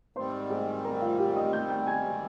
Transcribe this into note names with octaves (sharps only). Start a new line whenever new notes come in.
G#2 D#3 G3 C4 C5 C6
G#4 G#5
A#4 A#5
F4 F5
G4 G5
D#5 D#6
G5 G6
G5 G6
G#5 G#6